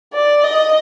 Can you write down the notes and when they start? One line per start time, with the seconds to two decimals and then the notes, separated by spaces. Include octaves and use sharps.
0.13 D5
0.44 D#5